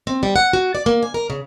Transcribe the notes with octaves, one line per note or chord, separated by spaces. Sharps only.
C4
G3
F#5
F#4
D5
A#3
G#5
A#4
C#3